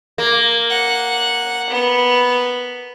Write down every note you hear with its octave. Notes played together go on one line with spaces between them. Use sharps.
A#3
F#5
B3